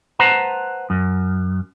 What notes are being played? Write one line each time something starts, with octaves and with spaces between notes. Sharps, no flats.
B4 C5 F#5 A5 A#5
F#2